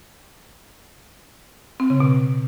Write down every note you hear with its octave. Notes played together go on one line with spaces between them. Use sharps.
C4
C#3
B2